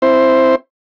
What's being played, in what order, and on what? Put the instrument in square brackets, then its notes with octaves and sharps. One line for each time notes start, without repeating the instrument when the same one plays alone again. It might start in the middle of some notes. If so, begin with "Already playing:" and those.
[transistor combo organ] C4 E4 C5